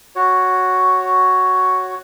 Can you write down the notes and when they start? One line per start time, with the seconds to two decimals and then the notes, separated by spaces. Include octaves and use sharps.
0.16 F#4 C#5